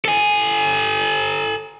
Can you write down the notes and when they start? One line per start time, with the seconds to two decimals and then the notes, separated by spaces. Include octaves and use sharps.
0.05 A4 G#5